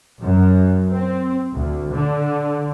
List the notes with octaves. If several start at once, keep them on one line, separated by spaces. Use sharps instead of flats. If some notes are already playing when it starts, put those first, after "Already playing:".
F#2
C4
D2
D3